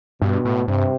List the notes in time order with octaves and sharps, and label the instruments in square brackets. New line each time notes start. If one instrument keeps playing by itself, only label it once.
[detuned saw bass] G2 [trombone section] B2
[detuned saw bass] A2
[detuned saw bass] G2 [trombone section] C3